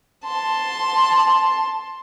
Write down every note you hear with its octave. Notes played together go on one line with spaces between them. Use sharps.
A5 C6